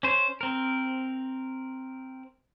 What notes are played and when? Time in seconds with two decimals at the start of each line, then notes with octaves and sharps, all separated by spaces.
0.03 C#4 C5
0.41 C4 A#4